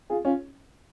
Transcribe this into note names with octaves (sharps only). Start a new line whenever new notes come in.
F4 G#4
C#4 F4